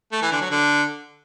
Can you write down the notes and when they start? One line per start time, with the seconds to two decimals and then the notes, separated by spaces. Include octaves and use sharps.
0.12 A3
0.22 E3
0.31 D3
0.41 F#3
0.51 D3